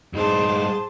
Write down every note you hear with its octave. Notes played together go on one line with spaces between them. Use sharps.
G2 D#4 G#4 C5 A5